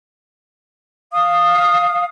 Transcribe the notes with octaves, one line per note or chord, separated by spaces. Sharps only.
F5 D#6